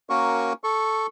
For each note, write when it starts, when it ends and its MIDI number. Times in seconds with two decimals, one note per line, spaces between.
0.10 0.53 58
0.10 0.53 61
0.10 0.53 66
0.10 0.53 70
0.10 0.53 85
0.64 1.07 69
0.64 1.07 85